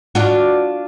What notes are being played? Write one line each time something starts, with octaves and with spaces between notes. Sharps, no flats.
D4 F4 F#4